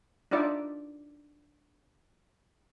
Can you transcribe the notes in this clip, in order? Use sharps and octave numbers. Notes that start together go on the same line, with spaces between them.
D4 D#4 F4 D5 E5